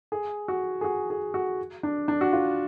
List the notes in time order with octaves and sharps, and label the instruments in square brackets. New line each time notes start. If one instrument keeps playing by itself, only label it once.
[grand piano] G#4
F#4
G#4
F#4
G#4
F#4
D4
D4
F#4
F4